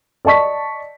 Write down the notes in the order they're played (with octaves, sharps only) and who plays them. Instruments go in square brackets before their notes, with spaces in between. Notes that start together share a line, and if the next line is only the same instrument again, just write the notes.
[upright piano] D5 D#5 A5 C#6 B6